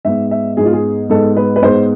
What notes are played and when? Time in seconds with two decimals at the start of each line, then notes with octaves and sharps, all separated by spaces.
0.05 G#2 G#3 B3 E5
0.31 E5
0.57 G#2 G#3 B3 G#4
0.66 F4
0.73 G#4
1.10 G#2 G#3 B3 A4
1.37 B4
1.56 B4
1.62 G#2 G#3 B3 C5